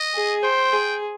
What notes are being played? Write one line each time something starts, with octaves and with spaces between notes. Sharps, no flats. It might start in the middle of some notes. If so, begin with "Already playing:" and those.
Already playing: D#5
G#4
C5 G5
G#4